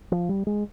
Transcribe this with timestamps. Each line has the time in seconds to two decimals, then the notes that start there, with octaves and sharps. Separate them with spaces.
0.12 F3
0.29 G3
0.47 G#3